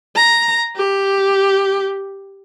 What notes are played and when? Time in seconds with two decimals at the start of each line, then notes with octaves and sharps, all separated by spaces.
0.16 A#5
0.76 G4